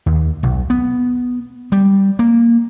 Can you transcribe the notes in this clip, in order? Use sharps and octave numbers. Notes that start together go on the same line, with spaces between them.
D#2
B1
B3
G3
A#3